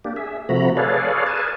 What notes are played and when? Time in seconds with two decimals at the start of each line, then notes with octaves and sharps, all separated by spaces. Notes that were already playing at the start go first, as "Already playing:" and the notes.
0.05 A#3 D4 G4
0.16 G#4 E5
0.49 C3 F3 A3 F#4 A#5 B5
0.77 G#4 A4 B4 C#5 D5 F5
1.27 G#4 A#4 B4 G#5 A5